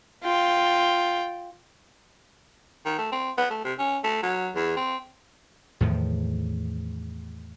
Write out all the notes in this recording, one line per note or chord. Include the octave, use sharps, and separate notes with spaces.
F4 G5
D#3
A3
C4
B3
A3
C3
C#4
A3
F#3
E2
C4
E2 A2 D#3 F3